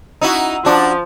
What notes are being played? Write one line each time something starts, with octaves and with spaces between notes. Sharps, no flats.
D#4 E4 F#4
F3 D4 F#4